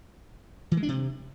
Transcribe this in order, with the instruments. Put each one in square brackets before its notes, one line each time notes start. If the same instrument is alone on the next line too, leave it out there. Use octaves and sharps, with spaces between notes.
[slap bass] E3
G#3
D4
C3